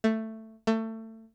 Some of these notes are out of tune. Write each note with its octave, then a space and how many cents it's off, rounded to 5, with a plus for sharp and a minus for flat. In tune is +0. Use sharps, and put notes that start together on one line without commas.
A3 +10
A3 +25